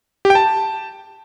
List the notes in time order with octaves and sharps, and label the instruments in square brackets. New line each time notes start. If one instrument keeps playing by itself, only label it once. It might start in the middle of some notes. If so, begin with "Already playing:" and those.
[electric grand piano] G4
G5
A5